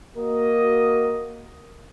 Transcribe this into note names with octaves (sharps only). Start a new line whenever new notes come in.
A#3 F#4 A#4 D#5